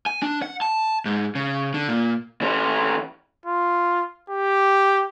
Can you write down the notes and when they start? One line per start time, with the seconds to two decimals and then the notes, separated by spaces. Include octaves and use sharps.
0.06 G#5
0.22 D4
0.42 F#5
0.61 A5
1.05 G#2
1.35 C#3
1.74 D3
1.89 A#2
2.41 E3 C#4
3.46 F4
4.30 G4